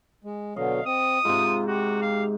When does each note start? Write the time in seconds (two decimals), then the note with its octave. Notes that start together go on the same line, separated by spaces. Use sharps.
0.24 G#3
0.56 B2 D3 F#3 D#5 F5
0.86 C4 D#6
1.25 G#2 C3 F4
1.68 F#4 G4
2.02 F5